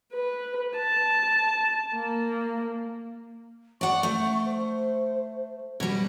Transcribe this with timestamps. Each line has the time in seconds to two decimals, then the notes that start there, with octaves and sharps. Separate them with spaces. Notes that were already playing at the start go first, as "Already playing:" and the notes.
0.13 B4
0.77 A5
1.95 A#3
3.81 D5 F#5 C#6
4.03 A3
4.45 C5
5.80 B2 G3